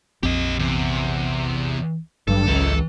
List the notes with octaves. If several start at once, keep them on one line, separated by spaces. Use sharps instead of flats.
A#1 F2 C4 G4 D#5
E2 C3
G#1 G2 F#3 A4
C#2 E3 D#4